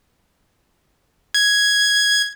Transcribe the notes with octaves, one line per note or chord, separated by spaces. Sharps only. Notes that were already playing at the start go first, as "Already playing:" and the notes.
G#6